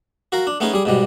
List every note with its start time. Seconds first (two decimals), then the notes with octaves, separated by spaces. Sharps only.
0.32 F#4 A#4 F5
0.47 D4
0.60 A3 B3 C#4 D#4 G#4
0.73 G3 G#4
0.85 G#2 B2 G3